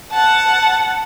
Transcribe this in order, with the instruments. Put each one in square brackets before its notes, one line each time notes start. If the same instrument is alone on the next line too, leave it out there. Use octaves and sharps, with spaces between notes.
[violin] F#5 A5